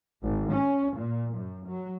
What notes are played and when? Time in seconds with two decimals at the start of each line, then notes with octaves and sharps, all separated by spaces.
0.22 G#1
0.51 C#4
0.93 A#2
1.35 F#2
1.67 F#3